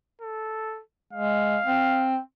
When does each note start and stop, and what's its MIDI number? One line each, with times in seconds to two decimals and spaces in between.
0.22 0.82 69
1.13 1.58 56
1.13 2.12 77
1.66 2.18 60